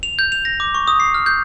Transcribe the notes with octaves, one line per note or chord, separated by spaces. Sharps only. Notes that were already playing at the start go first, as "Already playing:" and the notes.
F7
G6
F7
A#6
D6
C#6
D#6
C7
F6
G6